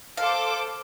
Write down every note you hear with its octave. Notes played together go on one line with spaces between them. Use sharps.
A4 C5 F5 D6